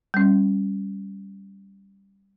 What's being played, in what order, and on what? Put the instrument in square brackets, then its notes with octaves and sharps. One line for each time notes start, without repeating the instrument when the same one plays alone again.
[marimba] G3 C#4